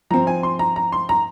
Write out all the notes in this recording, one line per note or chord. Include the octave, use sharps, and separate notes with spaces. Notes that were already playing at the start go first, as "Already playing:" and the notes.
F3 C4 A#5
G#5
C6
A#5
A#5
C6
A#5